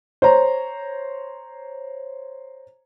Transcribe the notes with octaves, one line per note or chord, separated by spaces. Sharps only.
C5 C#5 A#5